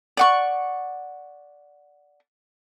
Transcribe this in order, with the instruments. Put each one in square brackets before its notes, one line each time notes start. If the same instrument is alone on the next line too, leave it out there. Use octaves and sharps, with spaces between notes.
[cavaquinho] D5 F#5 C#6